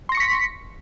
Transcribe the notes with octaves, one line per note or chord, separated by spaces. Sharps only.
C6 C#6 A#6 B6 C#7